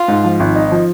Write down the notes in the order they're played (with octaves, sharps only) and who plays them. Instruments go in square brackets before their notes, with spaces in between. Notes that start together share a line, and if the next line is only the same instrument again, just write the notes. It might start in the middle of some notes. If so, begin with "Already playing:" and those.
Already playing: [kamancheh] F4
[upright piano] G#2
F3
G#1
D#4
F3